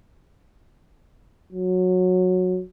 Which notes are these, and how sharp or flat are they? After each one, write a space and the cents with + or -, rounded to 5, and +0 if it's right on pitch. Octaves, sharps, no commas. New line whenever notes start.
F#3 -15